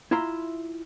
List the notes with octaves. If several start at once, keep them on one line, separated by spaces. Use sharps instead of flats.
E4 F4 E5 A#5 C6